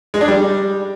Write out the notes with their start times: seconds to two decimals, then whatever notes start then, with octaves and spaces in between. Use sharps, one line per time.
0.14 G#3
0.21 D4
0.28 G3